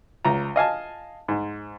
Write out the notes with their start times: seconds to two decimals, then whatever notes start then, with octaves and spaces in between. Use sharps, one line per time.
0.25 C#2 A#5
0.56 D#5 F5 G#5 A5
1.28 G#2